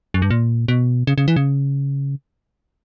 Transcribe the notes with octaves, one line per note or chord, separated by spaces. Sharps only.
F#2
G2
A#2
B2
C#3
C#3
E3
C#3